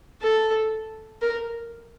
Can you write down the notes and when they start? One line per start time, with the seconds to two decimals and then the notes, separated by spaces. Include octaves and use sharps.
0.22 A4
1.22 A#4